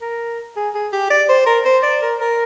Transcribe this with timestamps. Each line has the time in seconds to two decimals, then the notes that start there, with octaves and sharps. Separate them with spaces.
0.01 A#4
0.56 G#4
0.75 G#4
0.93 G4
1.10 D5
1.29 C5
1.47 A#4
1.65 C5
1.83 D5
2.02 A#4
2.20 A#4